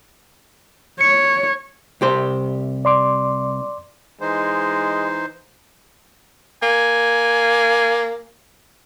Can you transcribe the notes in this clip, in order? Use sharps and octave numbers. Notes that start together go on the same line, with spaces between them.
C#5 C#7
C2 G4 C5
D5 C6 D6
E3 G#3 D#4 C5
A#3 G#5